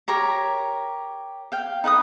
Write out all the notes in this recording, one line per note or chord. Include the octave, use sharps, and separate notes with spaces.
G4 A#4 C#5 A#5
F5 G5
D#4 B4 F#5 D#6